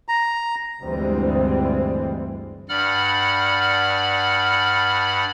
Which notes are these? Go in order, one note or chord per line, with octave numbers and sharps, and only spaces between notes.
A#5
D2 G2 E3 G3 G#3 C4
G2 D5 F#5 B5 F6